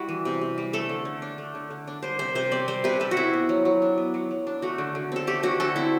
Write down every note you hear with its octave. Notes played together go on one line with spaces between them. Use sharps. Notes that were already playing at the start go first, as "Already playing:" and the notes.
Already playing: G3 E4 F#4
E3
C3
C3
G3
A3 A4
D3
D3
D4
A3
D3
D3
D4
G3 C5
C3 C5
C3 C5
C4 D5
G3 C5
C3 B4
C3 A4
F#4
C4 E4
B3
F#3
F#3
D4
B3
F#3
F#3
D4
A3 F#4
D3
D3
C4 A4
A3 G4
D3 F#4
D3 A4
C4 E4